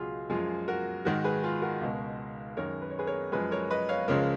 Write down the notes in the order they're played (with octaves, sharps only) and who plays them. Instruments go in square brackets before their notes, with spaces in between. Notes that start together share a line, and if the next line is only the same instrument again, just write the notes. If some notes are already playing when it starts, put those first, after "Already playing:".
Already playing: [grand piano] C#2 B2 F#3 F4 F#4 G#4
F#2 F3 G#3 F4 G#4
F#4 A#4
G#2 D#3 G#3 F#4 A#4
G#4 B4
F4 G#4
F#4 A#4
C#2 B2 G#3
F#2 D#3 G#3 A#4 C#5
B4
C#5
G#4 B4
A#4 C#5
F#2 F3 G#3 G#4 B4
A#4 C#5
B4 D#5
C#5 F5
C#2 C#3 F3 G#3 A#4 C#5